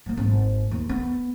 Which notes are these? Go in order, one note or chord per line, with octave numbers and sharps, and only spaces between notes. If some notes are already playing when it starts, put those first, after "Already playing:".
G3 A#3
G#1
D#2
B3